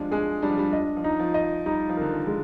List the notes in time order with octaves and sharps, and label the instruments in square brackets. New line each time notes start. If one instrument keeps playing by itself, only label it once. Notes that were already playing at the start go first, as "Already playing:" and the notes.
Already playing: [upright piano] F3 G3 G#3 [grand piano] D4
[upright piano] G#3 [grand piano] G#4
[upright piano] G3 [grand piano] D4
[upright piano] F3
G3
[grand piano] D#5
[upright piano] F3
[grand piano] D#4
[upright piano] F3
[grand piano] D#5
[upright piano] G3 [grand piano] D#4
[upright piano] F3
[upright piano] D3 [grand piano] A#4
[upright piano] D#3
[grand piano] G#3